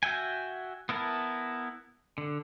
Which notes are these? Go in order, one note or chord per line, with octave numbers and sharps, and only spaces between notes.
F#4 E5 G5 G#5
B3 E4 A#4 A5
D3